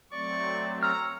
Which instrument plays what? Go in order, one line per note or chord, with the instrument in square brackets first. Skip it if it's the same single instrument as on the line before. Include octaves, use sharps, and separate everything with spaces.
[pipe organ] F#3 A3 C4 [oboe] D5 [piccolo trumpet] C#6
[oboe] C#5 [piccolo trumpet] A#5 [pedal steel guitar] E6 F6